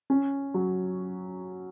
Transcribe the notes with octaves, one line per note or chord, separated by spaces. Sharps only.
C#4
F#3